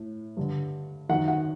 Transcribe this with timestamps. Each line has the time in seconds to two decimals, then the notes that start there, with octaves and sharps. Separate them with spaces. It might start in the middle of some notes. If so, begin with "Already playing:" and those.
Already playing: A2
0.37 G2 D3
1.09 D#3 F#5
1.13 F#2
1.28 F#5